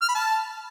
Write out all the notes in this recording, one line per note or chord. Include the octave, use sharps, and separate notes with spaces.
F6
B5
A5